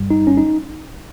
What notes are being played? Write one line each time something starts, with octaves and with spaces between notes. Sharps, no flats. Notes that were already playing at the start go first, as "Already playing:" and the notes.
Already playing: G1 G2 G3
D#4
C#4
D#4